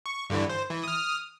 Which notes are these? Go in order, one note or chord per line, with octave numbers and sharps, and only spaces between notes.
C#6
G2 D3 E3
C5
E3
D#6 F6